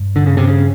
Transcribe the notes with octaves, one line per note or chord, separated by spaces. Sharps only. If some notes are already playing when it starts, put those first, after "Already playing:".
Already playing: G2
D3
C#3
C3
C#3